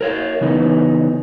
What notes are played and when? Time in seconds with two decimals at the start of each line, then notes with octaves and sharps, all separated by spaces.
0.01 A#4 C#5 F5
0.41 C#3 E3 B3 D#4 B4